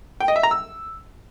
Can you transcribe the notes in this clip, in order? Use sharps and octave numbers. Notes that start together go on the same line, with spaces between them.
G5
D#5
E5
A#5
E6